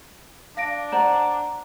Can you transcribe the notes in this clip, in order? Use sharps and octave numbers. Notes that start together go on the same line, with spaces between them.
D4 F5 A#6 D7
C5 D5 F#5 A#5